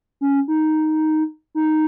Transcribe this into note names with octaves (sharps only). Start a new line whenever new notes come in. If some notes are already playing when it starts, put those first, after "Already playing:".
C#4
D#4
D#4